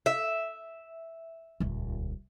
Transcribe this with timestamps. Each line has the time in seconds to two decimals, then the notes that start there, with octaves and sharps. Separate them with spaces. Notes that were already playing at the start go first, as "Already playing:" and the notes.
0.06 E5
1.60 D#1 C#2